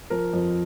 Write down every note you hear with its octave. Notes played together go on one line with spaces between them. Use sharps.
F3 A#4
F2